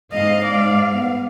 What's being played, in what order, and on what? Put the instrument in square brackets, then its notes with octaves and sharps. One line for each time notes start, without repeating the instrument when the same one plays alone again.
[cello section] G#2 F5 [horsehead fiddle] D#5
[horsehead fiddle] D5
B3